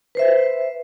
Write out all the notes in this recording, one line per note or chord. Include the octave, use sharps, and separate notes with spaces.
B4 C5 E5